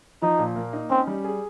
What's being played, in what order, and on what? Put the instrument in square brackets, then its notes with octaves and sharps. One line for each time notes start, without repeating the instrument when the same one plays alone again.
[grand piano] F3 [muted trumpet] D#4
[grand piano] A#2
A#3
D#4
[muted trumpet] C4 [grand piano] C#4
[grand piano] G3
G#4